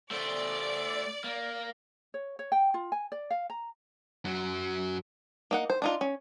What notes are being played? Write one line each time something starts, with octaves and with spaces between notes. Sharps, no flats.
A3 C5 D5
A#3
C#5
C#5
G5
F4
G#5
D5
F5
A#5
F#2 F#3
A#3 D#4 F#5
C5
D4 D#4 F4
C#4